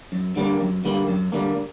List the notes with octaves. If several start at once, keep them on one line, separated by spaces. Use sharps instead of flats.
F#2
D3 G3 A#3
F#2
D3 G3 A#3
F#2
D3 G3 A#3